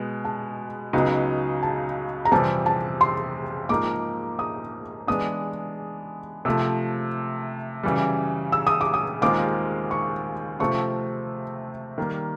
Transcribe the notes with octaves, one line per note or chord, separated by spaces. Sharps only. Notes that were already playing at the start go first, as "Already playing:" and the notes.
Already playing: B2 G#3 B3
A5
C#2 C#3 F#3 B3 D#4
A5
A#5
F2 C3 E3 G3 C4 A5
A5
C6
G#2 F3 A#3 D#4 D6
D#6
E3 G#3 B3 D4 D#6
C3 F3 A3 E6
F#2 C#3 E3 G3
E6
D#6
D6
D#6
D#2 D#3 G#3 C4 F4 D6
C#6
C3 F3 A3 C4 F4 C#6
D#3 G3 A#3